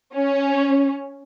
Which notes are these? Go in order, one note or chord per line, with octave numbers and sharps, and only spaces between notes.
C#4